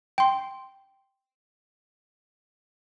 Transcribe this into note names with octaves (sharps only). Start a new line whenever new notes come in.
G5 C6